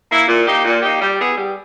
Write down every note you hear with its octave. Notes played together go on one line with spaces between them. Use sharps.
A#3 E4
A#2
A#3 D#4 G4
A#2
A#3 D#4 G4
G3
B3 E4 G#4
G3